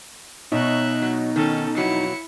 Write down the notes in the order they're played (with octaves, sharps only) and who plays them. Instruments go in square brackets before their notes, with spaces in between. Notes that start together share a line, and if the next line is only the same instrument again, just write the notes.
[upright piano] B2 [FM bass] D#4 [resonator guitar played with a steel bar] C#5 [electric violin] E5 F#6
[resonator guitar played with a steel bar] F#3
[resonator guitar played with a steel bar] D#3 [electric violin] C#4 A4
[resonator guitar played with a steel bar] F2 B2 F#3 [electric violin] E4 C#7